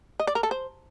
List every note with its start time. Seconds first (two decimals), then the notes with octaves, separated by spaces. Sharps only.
0.20 D#5
0.27 D5
0.35 A#4
0.43 A4
0.51 C5